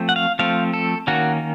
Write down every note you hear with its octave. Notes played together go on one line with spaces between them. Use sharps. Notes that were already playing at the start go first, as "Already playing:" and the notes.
Already playing: F3 A3 C4
F#5
F5
F3 A3 C4 F5
A4
D#3 A#3 C#4 F#4